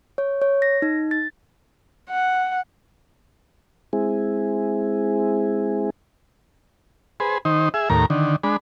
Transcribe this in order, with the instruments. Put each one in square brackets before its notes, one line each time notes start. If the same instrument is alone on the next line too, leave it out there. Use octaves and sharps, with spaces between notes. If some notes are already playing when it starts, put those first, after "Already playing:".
[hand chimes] C#5
C#5
A#6
D#4
A6
[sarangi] F#5
[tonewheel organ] G#3 C4 E4 G#4
[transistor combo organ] G#4 B4 C5
D#3 D#4 C5
G#4 E5
D#2 A2 A#4 A#5
D3 D#3
G#3 D4 B5